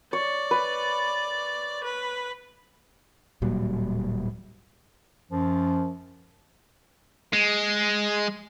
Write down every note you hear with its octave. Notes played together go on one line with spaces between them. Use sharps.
C#5 D5
B4
B4
D1 A#2 F#3 G3
F#2 F3
G#3